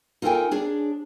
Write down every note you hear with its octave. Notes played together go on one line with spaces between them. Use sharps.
D#4 F4 A4 A#4 G5 G#5
D4 G#4 C#5